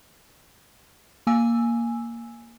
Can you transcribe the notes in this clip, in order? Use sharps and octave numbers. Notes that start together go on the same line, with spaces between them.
A#3 G#5 E6